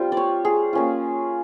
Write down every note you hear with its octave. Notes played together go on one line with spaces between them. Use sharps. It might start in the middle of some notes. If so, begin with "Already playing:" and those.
Already playing: G3 C4 F4
D5
C#5
G#4
A#3 C#4 F4